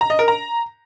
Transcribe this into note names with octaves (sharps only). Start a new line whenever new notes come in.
A#5
D#5
A#4
A#5